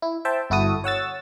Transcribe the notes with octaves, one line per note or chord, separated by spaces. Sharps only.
E4
C5 E5 G5 A5
G1 E4 F#4 A4 D#6
C#5 F#5 E6 A6